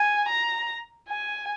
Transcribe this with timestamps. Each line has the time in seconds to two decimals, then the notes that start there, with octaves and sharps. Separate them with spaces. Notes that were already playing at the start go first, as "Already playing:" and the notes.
Already playing: G#5
0.29 A#5
1.08 G#5